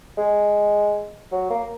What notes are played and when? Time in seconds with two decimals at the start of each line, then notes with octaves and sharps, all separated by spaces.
0.18 G#3
1.32 F#3
1.50 A#3